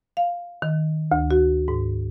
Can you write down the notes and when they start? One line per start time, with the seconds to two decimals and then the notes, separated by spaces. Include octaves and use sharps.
0.17 F5
0.62 D#3
1.12 D2
1.31 F#4
1.68 G#2